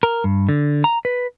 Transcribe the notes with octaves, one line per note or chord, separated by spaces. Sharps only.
A#4
G2
D3
A#5
B4